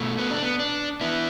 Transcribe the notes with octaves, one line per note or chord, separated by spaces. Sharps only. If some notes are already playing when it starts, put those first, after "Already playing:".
Already playing: B2 A3
B3
D4
B3
D4
B3 E4